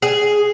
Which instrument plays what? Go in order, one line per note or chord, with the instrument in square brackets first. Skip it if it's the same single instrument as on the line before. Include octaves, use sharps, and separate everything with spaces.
[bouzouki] G#4